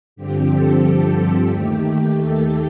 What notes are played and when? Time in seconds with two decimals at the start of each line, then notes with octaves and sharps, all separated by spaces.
0.16 G2 D3 F3 C4 G4
0.49 A4
0.83 G4
1.15 A4
1.48 D#2 D#3 A3 G4
1.82 G4
2.15 A4